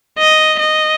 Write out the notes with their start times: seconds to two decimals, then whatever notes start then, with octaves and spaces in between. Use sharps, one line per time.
0.19 D#5
0.60 D#5